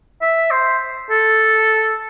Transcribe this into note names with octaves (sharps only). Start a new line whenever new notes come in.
E5
C5
A4